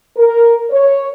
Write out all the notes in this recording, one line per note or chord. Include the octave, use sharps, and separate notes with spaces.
A#4
C#5